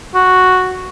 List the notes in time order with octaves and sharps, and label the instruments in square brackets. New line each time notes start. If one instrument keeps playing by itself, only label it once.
[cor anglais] F#4